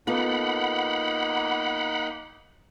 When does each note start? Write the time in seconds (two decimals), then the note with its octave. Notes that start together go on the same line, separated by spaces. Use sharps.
0.07 A#3 B3 D#4 F4 A4 F#5 B5